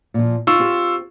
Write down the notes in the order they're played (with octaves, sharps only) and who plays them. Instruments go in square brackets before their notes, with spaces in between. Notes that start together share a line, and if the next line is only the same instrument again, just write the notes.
[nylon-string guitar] A#2 F3
[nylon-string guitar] D#4 [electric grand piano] F4 C#6 E6
[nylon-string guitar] C4 G4